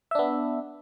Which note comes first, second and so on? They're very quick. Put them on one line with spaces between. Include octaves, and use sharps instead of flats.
E5 D4 B3